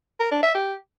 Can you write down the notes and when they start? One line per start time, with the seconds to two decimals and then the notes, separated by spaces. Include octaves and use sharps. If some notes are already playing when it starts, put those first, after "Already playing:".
0.20 A#4
0.31 D4
0.43 E5
0.54 G4